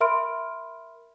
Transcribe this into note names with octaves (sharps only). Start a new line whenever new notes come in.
A#4 E5 B5 C6 F6 D7